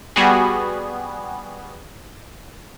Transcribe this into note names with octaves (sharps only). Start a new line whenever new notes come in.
G3 B3 F#4 G#4